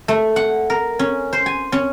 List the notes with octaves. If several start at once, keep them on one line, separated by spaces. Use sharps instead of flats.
A3
F#5
A#4
C#4
C5
G#5
C#4